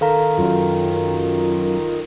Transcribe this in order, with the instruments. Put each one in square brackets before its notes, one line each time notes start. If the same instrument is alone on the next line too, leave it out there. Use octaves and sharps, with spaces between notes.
[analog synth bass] D#3 [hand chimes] A4 F5 A#5
[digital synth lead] F#2 [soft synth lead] F4